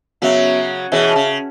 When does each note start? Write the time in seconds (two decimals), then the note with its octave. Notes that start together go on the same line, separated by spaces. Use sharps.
0.22 C#3 F#3 B3 F#4 C#5 E5
0.92 B2 E3 G#4 C#5 E5
1.16 C#3